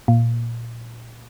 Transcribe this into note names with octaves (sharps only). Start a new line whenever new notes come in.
A#2